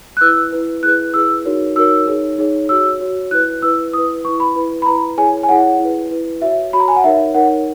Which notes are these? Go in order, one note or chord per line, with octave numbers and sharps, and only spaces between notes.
F#6
E4 B4 E6
E4 B4
E4 G#4 B4 F#6
E4 G#4 B4 E6
D#4 F#4 A#4 C#5
D#4 F#4 A#4 C#5 E6
D#4 G#4 C#5
D#4 G#4 C#5
F#4 C#5 E6
F#4 C#5
E4 B4 F#6
E4 B4 E6
E4 B4 D#6
E4 B4 C#6
B5
E4 B4
B5
E4 B4 A#5
E4 G#4 C#5 G#5
G#5
E4 G#4 C#5 F#5
E4 B4
E4 B4
F#4 C#5 E5
F#4 C#5 B5
A#5
G#5
F#5
D#4 A#4 C#5 E5
D#4 A#4 C#5 F#5